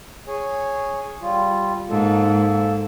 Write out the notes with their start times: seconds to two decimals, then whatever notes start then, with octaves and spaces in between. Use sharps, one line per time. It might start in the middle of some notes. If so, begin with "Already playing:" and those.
0.28 G#4 C#5 G#5
1.21 G3 F4
1.90 G#2 A#3 A4